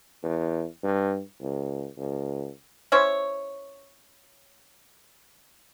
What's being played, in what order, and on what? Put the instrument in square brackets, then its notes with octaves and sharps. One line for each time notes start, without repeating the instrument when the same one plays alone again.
[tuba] E2
G2
C#2
C#2
[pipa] C#4 E4 C5 C#5